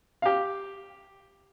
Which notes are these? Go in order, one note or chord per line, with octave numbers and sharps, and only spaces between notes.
G4 F5